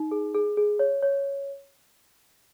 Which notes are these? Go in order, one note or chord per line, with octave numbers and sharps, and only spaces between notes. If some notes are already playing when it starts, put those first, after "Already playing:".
Already playing: D#4
G#4
G#4
G#4
C#5
C#5